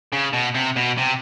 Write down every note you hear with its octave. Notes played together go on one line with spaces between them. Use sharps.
C#3
B2
C3
B2
C3